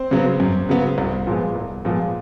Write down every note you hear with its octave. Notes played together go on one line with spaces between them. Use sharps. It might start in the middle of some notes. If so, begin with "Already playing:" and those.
Already playing: C4 C5
C#3 F#3 B3
F#2
C#3 F#3 B3
C2
A#2 F3 G#3 B3
C2
A#2 F3 G#3 B3